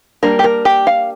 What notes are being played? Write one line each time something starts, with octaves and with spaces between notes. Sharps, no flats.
G3 A#3 D4 A#4
G4
A#4
G4
F5